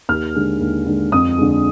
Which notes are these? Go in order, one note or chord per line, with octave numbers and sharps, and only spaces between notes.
D#2 F6
D3 G#3
D#2
D3 G#3
F2 D#6
D3 G#3